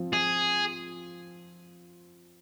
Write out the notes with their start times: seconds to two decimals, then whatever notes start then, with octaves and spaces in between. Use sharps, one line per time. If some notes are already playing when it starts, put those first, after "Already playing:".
Already playing: F3 C4 F4
0.13 G#4